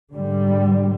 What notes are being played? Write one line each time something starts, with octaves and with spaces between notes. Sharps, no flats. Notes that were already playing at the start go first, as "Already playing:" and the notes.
G#2 D3 G3